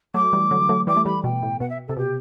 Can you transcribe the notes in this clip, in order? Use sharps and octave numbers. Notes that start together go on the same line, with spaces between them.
F#3 A3 D6
E3 G3
D3 F#3
F#3 A3
E3 G3 D6
A3
E3 G3 B5
B2 G5
A2
B2 F#5
E5
C3 A4
B2 G4